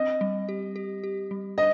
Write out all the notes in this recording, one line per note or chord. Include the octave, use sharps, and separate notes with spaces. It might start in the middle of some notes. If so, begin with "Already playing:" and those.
Already playing: C4 D#5
G3
G4
G4
G4
G3
C5 D#5